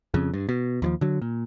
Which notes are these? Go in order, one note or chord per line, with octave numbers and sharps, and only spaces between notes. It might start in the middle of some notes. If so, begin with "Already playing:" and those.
F2 C#3
G2
B2
D#2 E3 F3
D3 F#3
A#2